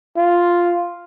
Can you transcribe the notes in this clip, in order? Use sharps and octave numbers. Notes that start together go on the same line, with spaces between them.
F4